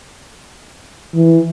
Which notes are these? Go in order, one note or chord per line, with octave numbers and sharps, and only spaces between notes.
E3